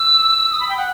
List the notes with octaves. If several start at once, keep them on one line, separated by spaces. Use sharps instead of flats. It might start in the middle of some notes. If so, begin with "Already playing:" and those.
Already playing: E6
D#6
B5
G5
F#5